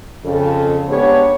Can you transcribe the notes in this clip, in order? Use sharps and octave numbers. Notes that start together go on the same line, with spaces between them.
F2 C#3 A4
G#2 B3 D4 G4 C#5